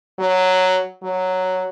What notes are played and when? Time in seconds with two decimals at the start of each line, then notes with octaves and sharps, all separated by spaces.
0.19 F#3
1.04 F#3